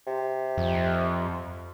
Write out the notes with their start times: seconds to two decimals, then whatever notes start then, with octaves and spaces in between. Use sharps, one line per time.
0.07 C3
0.58 F2